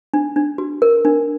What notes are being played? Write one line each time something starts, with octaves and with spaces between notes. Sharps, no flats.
D4
D4
F#4
A#4
D4